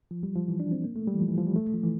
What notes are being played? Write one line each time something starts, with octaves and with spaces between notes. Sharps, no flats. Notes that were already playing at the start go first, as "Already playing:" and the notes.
F3
G3
F3
E3
D4
C4
A#3
A3
G3
E3
F3
E3
F3
G3
A3
F3
E3